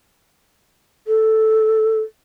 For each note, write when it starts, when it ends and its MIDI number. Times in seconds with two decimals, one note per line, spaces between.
1.07 2.00 69